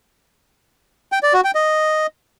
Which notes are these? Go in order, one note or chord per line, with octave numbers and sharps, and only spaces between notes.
G5
D5
F#4
G5
D#5